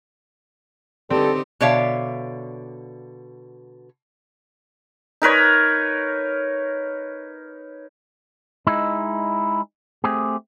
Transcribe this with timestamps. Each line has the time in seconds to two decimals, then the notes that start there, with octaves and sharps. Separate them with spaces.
1.10 D3 G3 C4 D#4 G4 A4
1.61 B2 D3 C#5 D5 E5 F5
5.22 D#4 A#4 B4 C#5
8.67 G#3 D#4 E4
10.04 A3 C4 G4 G#4